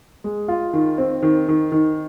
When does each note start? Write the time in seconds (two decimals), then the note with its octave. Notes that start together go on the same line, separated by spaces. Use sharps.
0.24 G#3
0.48 F4
0.73 D#3
0.98 C4
1.23 D#3
1.48 D#3
1.72 D#3